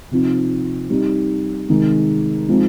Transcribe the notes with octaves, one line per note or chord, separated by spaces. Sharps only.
C3 F3 C4 D#4
G3 C4 D#4
C3 D#3 G#3 D#4
F3 G#3 C4 D#4